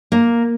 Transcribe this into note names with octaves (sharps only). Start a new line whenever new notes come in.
A#3